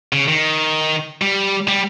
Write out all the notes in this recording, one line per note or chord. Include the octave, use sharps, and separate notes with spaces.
C#3
D#3
G3
G3